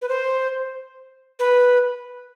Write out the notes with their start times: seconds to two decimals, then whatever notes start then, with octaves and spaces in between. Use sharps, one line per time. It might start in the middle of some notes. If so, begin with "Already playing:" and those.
0.02 B4
0.09 C5
1.39 B4